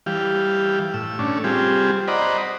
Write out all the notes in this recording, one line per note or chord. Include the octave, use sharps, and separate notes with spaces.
E3 G3 G4 F5
A2 E6
A3 C#4 D4
G3 C4 F4 G4 G#4
C5 D5 D#5 F#5 A#5 B5